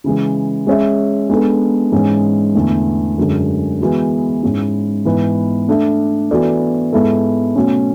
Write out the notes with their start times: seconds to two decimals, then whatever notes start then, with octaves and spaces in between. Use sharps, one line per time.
0.04 C#3 E3 G#3
0.67 G#3 C#4 G#4 C#5 E5
1.29 G#3 B3 D4 A4
1.92 G#2 E3 G#3 C#4
2.55 E2 D3 A3
3.18 F#2 D3 G#3
3.81 E3 G#3 B3 F#4
4.43 G#2 G#3 C#4 E4
5.05 G#2 E3 B3 E4 B4
5.68 A3 D4 A4 E5
6.31 E3 B3 F#4 A4 D5
6.93 G#2 G#3 B3 E4 A4
7.55 B2 F#3 A3 C#4